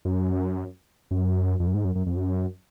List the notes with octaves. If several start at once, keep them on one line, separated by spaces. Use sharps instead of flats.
F#2
F#2
F2
F#2
G#2
F#2
F#2
F2
F#2